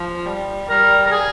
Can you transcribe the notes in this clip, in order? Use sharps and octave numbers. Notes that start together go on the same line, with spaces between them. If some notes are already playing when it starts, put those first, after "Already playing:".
Already playing: F3
G3
G3 A#4
A#4
G#4